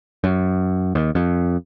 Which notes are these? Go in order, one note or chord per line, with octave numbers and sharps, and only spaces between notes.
F#2
D#2
F2